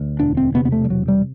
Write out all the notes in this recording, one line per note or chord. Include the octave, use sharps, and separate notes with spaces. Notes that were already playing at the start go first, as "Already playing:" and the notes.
Already playing: D2
E1 D4
C4
C3 B3
B3
A3
G3
E1 F#3
G3